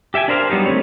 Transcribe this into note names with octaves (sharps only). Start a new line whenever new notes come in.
G4 E5 G5 G#5
D4 A#4 C5 F5
F#3 G3 B3 D#4 G4
D#3 A3 C4 C#5